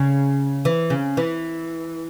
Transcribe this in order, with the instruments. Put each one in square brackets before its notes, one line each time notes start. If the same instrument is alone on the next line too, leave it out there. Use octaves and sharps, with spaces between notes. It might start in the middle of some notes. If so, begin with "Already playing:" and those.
Already playing: [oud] C#3
E3
C#3
E3